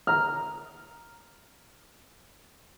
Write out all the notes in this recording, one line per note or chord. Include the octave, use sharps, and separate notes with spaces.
A#5 F6